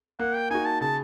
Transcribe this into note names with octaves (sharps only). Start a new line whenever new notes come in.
A#3 F#5
G5
D#4 F#4 G#5
A5
C#3 A5